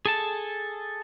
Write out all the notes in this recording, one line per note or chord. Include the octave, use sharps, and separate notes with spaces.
G#4 A4 A5